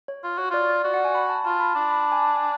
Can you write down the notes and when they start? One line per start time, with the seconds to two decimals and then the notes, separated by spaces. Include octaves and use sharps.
0.08 C#5
0.23 F4
0.38 F#4 C#5
0.51 F4 D5
0.69 D5
0.84 F#4 D5
0.94 F#5
1.05 G#5
1.15 B5
1.29 A5
1.45 F4 A5
1.60 B5
1.75 D4 A5
1.91 B5
2.01 A5
2.12 G#5
2.22 A5
2.36 G#5